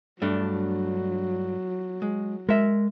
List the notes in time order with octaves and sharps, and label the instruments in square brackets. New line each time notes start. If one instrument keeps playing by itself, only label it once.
[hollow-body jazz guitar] G2 A3 D4 [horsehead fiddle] F#3
[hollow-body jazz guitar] G#3
[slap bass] G#3 [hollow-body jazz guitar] A#4 E5